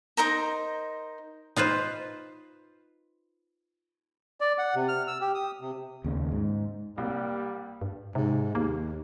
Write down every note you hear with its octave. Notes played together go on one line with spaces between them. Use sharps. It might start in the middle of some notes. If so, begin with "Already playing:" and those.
D#4 A#4 C5 A#5
D#4 F4 B4 C5
D5
F#5
C3
F6
E6
G4
D#6
C3
D#2 C#3
G#2
C2 G3 A#3
G2
G#2 C3
D#2 A#3